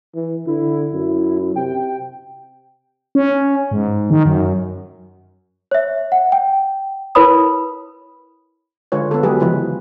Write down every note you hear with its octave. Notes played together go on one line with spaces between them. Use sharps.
E3
D3 E4
F#2
C3 G5
C#4
G#2
D#3
F#2
C#5 E5
F#5
G5
E4 A#4 B4 C#5 B5 D#6
D3 G#3 F4 B4 C#5
B3 A4
F#3 G#3 G4 G#4 B4
C#3 E3 F3 G#3 E4 B4